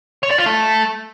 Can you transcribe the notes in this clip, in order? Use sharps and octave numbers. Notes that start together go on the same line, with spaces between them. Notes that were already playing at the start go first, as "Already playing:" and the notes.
C#5
D5
F4
A3